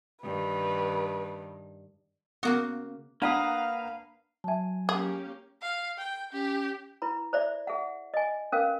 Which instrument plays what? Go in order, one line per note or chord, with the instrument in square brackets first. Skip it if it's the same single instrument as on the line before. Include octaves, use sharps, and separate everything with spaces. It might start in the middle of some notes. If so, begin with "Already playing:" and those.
[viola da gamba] G2 D#3 [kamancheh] B4
[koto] C#3 A#3 F#4 [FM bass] B3
[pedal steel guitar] A#3 B4 D#6 [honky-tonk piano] D4 F#5 A#5 [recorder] F5
[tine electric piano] F#3 G#5 [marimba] E5 A5
[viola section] A#3 C#4 G4 [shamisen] G#4
[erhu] F5
G5
[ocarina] C#4 [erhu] G4
[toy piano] E4 B4 B5
C5 D5 E5
G#4 E5 F#5
D#5 G#5
C#4 A#4 B4 F5